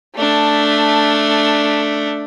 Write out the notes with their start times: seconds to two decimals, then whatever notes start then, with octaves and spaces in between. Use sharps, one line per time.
0.16 A3 D4